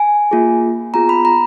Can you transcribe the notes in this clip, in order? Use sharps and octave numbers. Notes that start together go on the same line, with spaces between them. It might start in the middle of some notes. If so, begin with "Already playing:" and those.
Already playing: G#5
A#3 F4 G#4
B3 F4 G#4 A#5
B5
A#5